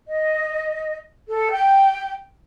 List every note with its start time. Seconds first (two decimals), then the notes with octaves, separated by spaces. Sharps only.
0.08 D#5
1.29 A4
1.51 G5